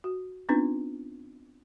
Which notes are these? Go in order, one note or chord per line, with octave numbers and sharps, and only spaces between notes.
F#4
B3 C4 D4 D#4 F4 B4